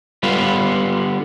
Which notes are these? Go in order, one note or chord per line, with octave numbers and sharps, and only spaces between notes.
D3 G3 B3 F4 B4